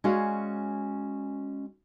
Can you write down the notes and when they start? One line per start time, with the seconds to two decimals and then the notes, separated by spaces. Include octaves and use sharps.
0.04 G#3 C#4 F#4 C#5 D5 F5